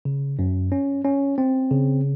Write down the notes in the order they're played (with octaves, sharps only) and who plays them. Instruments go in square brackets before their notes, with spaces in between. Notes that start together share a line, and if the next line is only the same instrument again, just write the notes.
[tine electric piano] C#3
F#2
C#4
C#4
C4
C#3